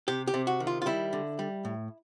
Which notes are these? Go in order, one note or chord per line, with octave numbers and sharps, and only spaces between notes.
C3 G4
G4
C3
F#4
D#3
F4
F4
G3 E4
D3
G3
A2